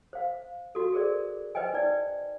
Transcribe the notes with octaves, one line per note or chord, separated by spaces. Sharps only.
C5 F5
F#4 A4
G#4 A#4 C5 D5
B4 C5 D#5 G5 G#5
D#4 D5